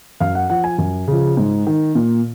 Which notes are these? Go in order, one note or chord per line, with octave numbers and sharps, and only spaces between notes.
F#2 F5
F#5
F3 F#5
G#5
F#2 G#5
C#3 F3
G#2
D#3
A#2